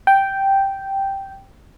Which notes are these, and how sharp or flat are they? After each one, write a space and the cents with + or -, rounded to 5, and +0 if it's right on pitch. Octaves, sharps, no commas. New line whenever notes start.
G5 -5